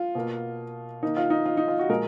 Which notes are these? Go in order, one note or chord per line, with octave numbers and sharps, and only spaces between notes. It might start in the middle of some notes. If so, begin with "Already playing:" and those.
Already playing: F4
B2 A#3
D#3 A#3 D#4
F4
D#4
F4
D#4
F4
F#4
A#2 F3 G#3 A#4